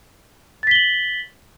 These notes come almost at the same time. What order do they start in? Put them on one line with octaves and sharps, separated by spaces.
A6 B6 G7 F#7